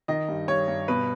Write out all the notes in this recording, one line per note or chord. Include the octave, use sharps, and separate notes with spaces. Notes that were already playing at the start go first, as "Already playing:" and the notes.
D#3 D#5
G2
G2 C#5
G2
B2 B4